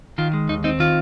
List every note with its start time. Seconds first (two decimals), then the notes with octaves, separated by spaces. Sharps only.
0.18 D#3 F4
0.33 G#3
0.49 D#2 D#4
0.64 C4 D#4
0.80 D#3 F4